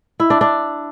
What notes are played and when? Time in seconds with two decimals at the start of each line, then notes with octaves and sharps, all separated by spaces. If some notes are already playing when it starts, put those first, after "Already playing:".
0.20 E4
0.30 D4
0.41 D4